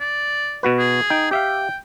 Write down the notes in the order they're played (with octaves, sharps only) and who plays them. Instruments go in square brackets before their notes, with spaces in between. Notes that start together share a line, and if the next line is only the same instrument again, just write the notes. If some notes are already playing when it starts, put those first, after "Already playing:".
[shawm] D5
[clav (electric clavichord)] B2 F#4 B4
[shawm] G#4
[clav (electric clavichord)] D#4 G5
[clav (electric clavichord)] G4 E5 F5 [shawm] G5